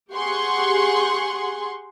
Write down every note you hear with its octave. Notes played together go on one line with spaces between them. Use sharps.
G4 G#4 F#5 C6 C#6